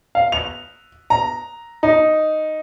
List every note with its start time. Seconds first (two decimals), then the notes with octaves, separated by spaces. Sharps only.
0.15 F5
0.32 F7
1.10 A#5
1.83 D#4